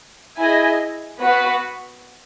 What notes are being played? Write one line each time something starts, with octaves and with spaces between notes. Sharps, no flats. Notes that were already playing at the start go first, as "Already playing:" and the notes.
E4 G#4 D#5 G#5
B3 F#4 B4